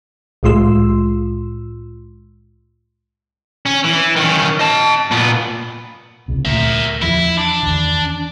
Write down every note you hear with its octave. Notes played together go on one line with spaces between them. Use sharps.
C2 A2 G#3 F4 C6 E6
C#4
E3
D#3 C#4
D#5 A5
A#2 B3
D1 C#2 C3
D2 A#2 A#4 E5
E2 F3 E4
D4
E2 D#3